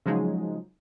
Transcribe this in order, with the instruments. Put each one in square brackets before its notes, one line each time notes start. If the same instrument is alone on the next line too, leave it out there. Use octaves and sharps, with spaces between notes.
[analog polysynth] C#3 F3 F#3 G#3 D#4